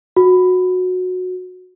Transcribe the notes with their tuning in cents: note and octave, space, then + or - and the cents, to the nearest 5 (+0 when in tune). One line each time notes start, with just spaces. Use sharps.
F#4 -15